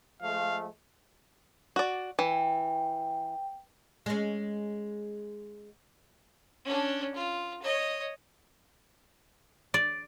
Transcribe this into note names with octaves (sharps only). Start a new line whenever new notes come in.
F3 G#3 A3 F5
F#4 D5
E3 G5
G#3 C#4
C#4 D4
F4
C#5 D#5
D5